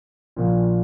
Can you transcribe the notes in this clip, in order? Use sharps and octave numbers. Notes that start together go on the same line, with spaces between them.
A#1 A#2 F3